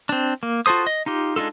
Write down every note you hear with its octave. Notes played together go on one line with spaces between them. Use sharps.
C4 D4
A#3
F4 F#4 A4 C5 D#6
D#5
D#4 F4 G4
G#3 D4 D#4 F4 A4